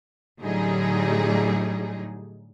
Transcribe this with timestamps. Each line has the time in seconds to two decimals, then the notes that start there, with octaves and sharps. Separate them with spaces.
0.42 A2 D3 F#3 G3 D#4 G#4